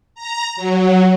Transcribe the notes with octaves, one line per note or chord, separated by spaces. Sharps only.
A#5
F#3